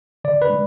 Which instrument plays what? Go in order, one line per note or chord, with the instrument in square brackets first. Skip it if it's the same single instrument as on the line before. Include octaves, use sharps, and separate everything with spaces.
[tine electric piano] D3 D5
B4
G#3